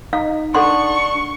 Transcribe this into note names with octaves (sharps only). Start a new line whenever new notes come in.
D#4 F5
D4 A4 F#5 C6 C#6